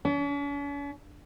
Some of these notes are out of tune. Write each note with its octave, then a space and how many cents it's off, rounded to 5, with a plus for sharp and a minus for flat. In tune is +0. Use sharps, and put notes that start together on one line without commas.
C#4 +45